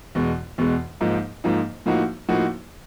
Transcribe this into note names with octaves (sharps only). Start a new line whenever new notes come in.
E2 B2 G#3
E2 B2 G#3
G#2 F3 A#3 D#4
G#2 F3 A#3 D#4
A2 F3 A#3 D#4 F#4
A2 F3 A#3 D#4 F#4